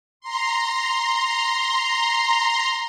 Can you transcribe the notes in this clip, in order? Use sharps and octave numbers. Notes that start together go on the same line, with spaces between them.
A#5 C6